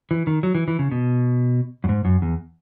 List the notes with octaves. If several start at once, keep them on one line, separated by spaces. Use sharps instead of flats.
E3
D#3
F#3
E3
E3
C#3
B2
F#2
G#2
F#2
E2